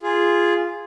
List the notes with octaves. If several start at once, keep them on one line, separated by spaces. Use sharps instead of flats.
F4 G#4